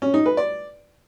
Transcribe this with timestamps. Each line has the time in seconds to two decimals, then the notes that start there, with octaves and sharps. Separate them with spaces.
0.02 C#4
0.14 D#4
0.26 B4
0.37 D5